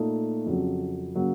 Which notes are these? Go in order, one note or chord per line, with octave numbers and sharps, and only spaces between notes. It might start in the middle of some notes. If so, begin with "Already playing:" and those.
Already playing: A#2 A3 D#4
F2 C#3 F#3
C#3 F#3 A#3